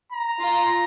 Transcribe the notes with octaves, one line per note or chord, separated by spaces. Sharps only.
A#5
F4